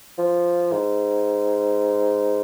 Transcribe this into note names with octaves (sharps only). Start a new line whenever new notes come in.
F3
G#2